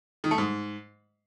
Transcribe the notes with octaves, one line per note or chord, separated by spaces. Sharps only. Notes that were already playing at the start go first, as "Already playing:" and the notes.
D#3
A3
G#2